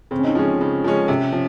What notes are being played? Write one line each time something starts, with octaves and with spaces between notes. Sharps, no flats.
C#3 C4
C#4
D#4
F3 G#3 C#4 F4
D#4
C#3 D#4
F3 G#3 C#4
C3 C#4
F3 C#4